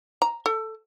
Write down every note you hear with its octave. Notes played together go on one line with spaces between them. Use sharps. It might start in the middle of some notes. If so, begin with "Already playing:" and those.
A#5
A4